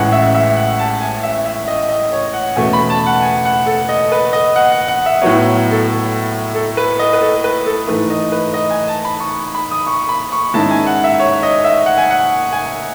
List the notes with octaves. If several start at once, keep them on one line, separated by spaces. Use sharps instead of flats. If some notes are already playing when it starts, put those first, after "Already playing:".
Already playing: A1 A2 G#3 C#4 F#5
E5
E5
F#5
A5
G#5
E5
E5
D#5
D#5
C#5
F#5
E2 B2 A3 C#4 G#5
B5
A5
F#5
G#5
F#5
A4
D#5
B4
D#5
F#5
F#5
F#5
E5
A2 F#3 B3 C#5
A4
A4
B4
D#5
B4
A4
B4
A4
G#2 E3 A3 B4
D#5
B4
D#5
G#5
A5
B5
C#6
B5
D#6
C#6
B5
C#6
G#2 D#3 G#3 C#4 E4 A5
G#5
F#5
E5
C#5
D#5
E5
F#5
G#5
F#5
G#5